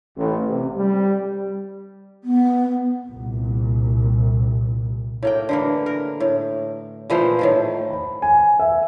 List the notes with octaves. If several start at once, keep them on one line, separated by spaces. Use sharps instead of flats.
A1
C3
G3
B3
C2 A#2
A2 A#3 G5
D3 E3 A#3
A#4
A2
A#2 E3 F3 C5
A2 D#3 F3
B5
G#5
E5